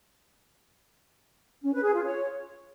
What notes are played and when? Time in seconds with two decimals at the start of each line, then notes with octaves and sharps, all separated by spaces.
1.62 C#4
1.73 B4
1.84 G#4
1.94 F4
2.05 C#5